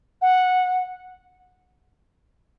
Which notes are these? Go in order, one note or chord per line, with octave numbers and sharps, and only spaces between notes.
F#5